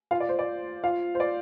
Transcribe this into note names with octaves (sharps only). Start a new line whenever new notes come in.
F4 F5
D5
C5
D5
F4 F5
C5
D5